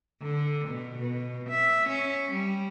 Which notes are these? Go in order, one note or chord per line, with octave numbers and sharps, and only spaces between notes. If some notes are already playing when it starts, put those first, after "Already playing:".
D3
B2
B2
E5
C#4
G3